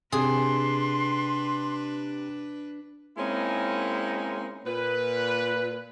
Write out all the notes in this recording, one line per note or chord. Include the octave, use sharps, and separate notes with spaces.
C3 D4 G#4 B4 C6
G#3 A#3 C4 C#4 D#4 E4
A#2 B4